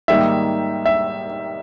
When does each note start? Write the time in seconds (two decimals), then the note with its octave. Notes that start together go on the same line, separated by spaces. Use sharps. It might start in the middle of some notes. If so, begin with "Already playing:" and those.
0.08 G#2 D#3 G3 A#3 D#4 E5
0.86 E5